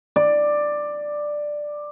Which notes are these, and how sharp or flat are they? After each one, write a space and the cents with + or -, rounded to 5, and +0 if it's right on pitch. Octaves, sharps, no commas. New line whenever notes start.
D5 +10